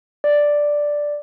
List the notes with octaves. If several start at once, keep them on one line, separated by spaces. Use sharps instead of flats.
D5